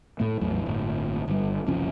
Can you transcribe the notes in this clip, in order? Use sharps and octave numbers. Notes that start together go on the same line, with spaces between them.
A2 A3
A1 E2 A2 F#3
G1 A2
G1 G3
F#1 C2 F3 C#4